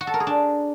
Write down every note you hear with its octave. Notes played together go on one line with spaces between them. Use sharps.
F#4
A4
A#4
G#4
D4